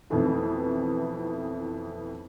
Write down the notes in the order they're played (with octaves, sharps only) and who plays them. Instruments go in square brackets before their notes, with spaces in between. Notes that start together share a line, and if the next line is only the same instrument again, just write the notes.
[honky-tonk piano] F2 B2 D#3 E3 A3 E4